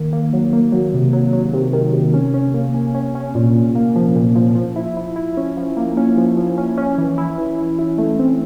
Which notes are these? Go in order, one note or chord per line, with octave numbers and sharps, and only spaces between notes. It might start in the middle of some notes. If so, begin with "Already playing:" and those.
Already playing: D#3 A#3
A#3
F#3
A#3
F#3
C3
F#3
F#3
C3
D#3
C3
C#4
C#4
A#3
C#4
C#4
C#4
A#2
A#2
A#3
F3
A#2
F3
F3
E4
E4
E4
C#4
F3
A#3
C#4
F3
F3
C#4
C#4
E3
E4
E3
E4
E4
A3
C4